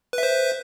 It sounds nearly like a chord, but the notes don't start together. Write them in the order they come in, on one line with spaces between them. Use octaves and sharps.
B4 E5 C5